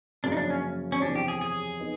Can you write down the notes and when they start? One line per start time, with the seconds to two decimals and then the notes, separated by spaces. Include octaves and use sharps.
0.24 F#2 C#3 F3 A#3 D4
0.32 D#4
0.37 D4
0.50 C#4
0.92 C#4
1.02 E2 C3 F3 D4
1.16 G4
1.28 G#4
1.41 G#4
1.80 B3 D#4